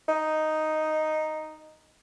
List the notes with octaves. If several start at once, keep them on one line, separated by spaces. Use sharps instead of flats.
D#4